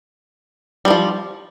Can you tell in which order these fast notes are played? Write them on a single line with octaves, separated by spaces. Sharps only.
G3 D#3 F3